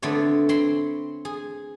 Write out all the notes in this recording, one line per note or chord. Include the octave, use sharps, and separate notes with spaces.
D3 A3 B3 C4 C#5
C4 C#5 B5 C6
G#4